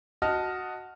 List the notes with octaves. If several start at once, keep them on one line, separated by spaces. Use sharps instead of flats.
F#4 D#5 A5 F6